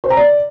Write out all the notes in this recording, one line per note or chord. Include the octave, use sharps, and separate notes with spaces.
C5
A#5
D5